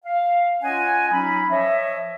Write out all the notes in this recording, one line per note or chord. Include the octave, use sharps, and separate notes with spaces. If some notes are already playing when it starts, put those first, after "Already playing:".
F5
C#4 F4 C#5 D#5 F#5 G#5
F#3 C#4 D#4 B5
F3 C#5 D#5 E5